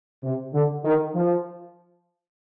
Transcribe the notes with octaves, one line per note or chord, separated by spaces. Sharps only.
C3
D3
D#3
F3